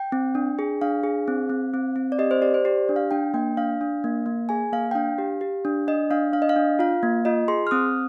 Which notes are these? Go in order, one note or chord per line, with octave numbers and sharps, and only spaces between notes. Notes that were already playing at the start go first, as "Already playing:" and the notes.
Already playing: G5
C4
D4
G#4
D4 F5
G#4
C4
C4
C4
C4
D5
G4 D#5
C5
G4 D5
C5
G4 D5
D4
F5
D4 G5
A#3 G5
D4 F5
D4
A#3
A#3
G#4 G#5
A#3 F5
G5
D4 F5
G4
G4
D4
D4 D#5
D4 F5
D4 F5
D#5
F5
D4
F4 F5
A#3
F4 D#5
G#4 C6
F6
C4 D#6